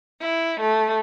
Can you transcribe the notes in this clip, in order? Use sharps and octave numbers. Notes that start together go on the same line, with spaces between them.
E4
A3